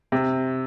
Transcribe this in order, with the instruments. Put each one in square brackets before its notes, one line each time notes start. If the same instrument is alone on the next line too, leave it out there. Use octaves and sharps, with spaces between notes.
[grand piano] C3